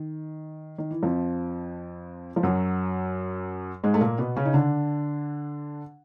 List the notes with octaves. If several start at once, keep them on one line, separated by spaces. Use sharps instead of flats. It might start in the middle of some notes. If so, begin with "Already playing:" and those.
Already playing: D#3
D#3
E3
F2 F3
F3
F#2 F#3
G#2 G#3
A3
A#2 A#3
B2 B3
C#3 C#4
D#4
D3 D4